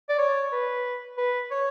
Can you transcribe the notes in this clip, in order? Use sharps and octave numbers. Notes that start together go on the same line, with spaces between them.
D5
C#5
B4
B4
C#5